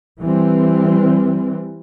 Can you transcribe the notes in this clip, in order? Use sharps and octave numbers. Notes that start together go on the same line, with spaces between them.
E3 G3 C4